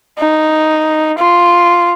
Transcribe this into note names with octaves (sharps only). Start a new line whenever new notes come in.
D#4
F4